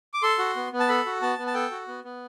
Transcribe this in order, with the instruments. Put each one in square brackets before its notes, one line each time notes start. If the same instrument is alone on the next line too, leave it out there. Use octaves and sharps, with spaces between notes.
[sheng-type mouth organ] D6
A4 C6
F#4
B3
B3
A5
A4 B5
F#4
B3 A5
B3
A5
A4 G5
F#4
B3
B3